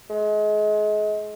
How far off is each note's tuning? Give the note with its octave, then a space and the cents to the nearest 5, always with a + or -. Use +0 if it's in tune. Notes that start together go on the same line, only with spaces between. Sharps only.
G#3 +30